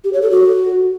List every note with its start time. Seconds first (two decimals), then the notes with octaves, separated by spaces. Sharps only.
0.04 G4
0.13 C#5
0.22 A4
0.31 F#4